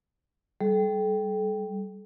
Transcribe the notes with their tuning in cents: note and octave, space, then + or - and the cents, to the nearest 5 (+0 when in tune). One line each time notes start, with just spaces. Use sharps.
G3 -5 A4 -40